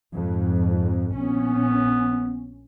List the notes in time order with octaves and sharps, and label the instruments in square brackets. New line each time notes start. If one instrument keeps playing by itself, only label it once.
[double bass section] F2 G#2
[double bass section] A#1 C#4 [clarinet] B3